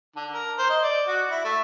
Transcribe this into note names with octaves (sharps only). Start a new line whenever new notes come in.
D3
A#4
C5
D#5
D5
F#4
E4
A3